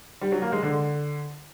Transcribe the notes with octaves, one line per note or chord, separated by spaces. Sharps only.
G3
F#3
A#3
G#3
D3